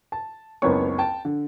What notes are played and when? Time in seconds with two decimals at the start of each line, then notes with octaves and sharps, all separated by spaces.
0.12 A5
0.62 F#1 C#2 B3 C4 C#5 C#6
0.99 G5 A5
1.25 D3